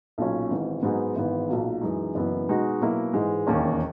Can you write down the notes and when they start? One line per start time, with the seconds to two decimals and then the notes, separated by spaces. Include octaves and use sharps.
0.18 B1 A#2 F#3 C#4
0.50 G#1 G#2 E3
0.83 G#2 F#3 B3 D#4 G#4
1.16 G#1 G#2 E3 B3
1.49 B1 A#2 F#3
1.81 F#2 E3 G#3 D#4
2.15 F#1 F#2 E3 B3
2.48 B2 G#3 D#4 F#4
2.81 B2 F#3 A#3 E4
3.13 G#2 E3 G#3
3.47 E1 D#2 D#3 A#3 C#4